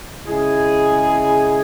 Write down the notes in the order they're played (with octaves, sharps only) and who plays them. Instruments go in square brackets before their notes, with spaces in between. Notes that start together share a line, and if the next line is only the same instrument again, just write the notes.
[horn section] C#3 G#3 E4 G#4